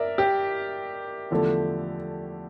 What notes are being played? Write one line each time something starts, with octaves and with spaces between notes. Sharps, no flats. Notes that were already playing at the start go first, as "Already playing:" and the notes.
Already playing: A#4 D5 E5
G4
E2 D3 F3 A3